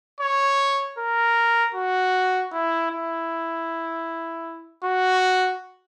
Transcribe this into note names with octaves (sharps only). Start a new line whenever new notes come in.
C#5
A#4
F#4
E4
E4
F#4